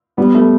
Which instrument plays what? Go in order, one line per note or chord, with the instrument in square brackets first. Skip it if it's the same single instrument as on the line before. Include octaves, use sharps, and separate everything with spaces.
[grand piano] G3 [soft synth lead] B3
[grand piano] A3